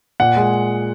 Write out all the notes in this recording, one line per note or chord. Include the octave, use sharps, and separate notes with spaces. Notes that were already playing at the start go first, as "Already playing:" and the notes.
A#2 F#5
G#3